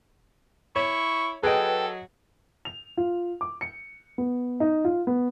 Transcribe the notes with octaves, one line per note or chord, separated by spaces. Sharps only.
E4 C#5 C#6
F#3 G#4 A4 B4 D#5 G5
F7
F4
D6
C#7
B3
D#4
F4
B3